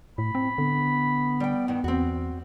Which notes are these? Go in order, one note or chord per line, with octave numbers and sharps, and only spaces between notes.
A2 B5
C4
D3 B3
G3 G5
G2 D#3
E2 C4 F#4